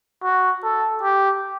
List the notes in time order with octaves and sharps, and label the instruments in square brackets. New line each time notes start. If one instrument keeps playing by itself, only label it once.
[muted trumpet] F#4
A4
G4